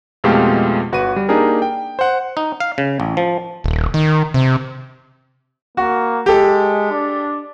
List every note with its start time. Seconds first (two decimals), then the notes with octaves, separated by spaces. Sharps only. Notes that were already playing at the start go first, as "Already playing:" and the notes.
0.24 F2 B2 G#3 A3 F4 G4
0.92 G1 F#4 B4 D#7
1.16 G3
1.29 A#3 D4 D#4 G4 G#4 A#4
1.62 G5
1.99 C5 F#5
2.37 D#4
2.60 F5
2.78 C#3
3.00 A1
3.17 F3
3.64 D#1
3.94 D#3
4.34 C3
5.77 A#3 F#4
6.26 G#3 G4 A4
6.92 D4